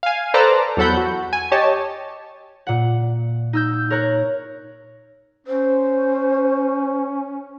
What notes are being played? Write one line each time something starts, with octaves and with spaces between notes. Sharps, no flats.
F5 G#5
A4 B4 C5 D5 A5 A#5
E2 F#3 A4 F#5 B5 G6
F#4
G#5
G4 C#5 D#5 A5
A#2 F#5
D#4 E6 G6
A#4 C#5 A#5 F#6
C#4 C5